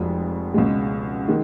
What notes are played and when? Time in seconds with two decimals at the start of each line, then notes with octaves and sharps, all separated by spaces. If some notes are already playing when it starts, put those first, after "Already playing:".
Already playing: F1 F2 F3 G#3 F#4
0.54 C#2 B2 G#3
1.28 D#3 G#3